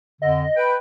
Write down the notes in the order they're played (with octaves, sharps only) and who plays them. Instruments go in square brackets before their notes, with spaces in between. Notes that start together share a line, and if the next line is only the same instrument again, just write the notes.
[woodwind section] F2 D3 [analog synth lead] D#5
[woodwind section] B4 G5